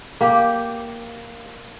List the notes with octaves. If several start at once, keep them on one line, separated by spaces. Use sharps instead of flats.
A#3 G4